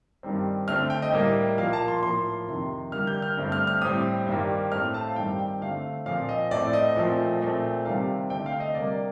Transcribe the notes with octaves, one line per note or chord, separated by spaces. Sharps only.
G2 D#3 G3 C4
D3 A3 C4 F6
G5
D#5
A2 G3 A#3
A#2 F3 A#3 F5
A5
C6
A2 F3 A#3 C6
F2 C3 D#3
D3 G3 A#3 F6
G6
F6
G2 D3 A3 C4
F6
F6
A2 G3 C4 D#6
G2 D#3 G3 A#3
A2 A3 C4 F6
A5
F5
G2 D#3 G3 C4 G5
G5
D3 A3 C4 F5
A#2 F3 C4 F5
D#5
A2 A3 C4 D5
D#5
A#2 F3 A3 C4
A#2 A3 C4
C3 D#3 G3 C4 F5
D3 A3 C4 G5
F5
D#5
C3 G3 A#3 D5